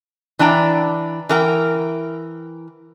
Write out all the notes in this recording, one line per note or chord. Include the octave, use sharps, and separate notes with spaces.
E3 D4 G5 A#5
E3 A#4 G5